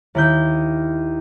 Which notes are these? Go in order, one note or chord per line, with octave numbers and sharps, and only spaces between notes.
D#2 E4 G6